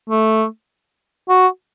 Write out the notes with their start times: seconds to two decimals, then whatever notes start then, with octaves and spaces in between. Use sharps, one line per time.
0.10 A3
1.29 F#4